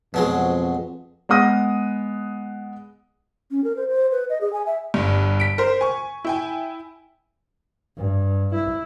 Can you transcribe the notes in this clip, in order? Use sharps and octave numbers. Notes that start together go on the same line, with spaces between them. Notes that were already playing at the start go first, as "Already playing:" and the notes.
F2 B2 F#3 G#3
G#3 B3 F#5 D#6 A#6
C#4
A#4
C5
C5
B4
D#5
G#4
G#5
E5
G1 G2
B6 D7
A#4 C5
G#5 C#6
E4 G5 G#5
G2
E4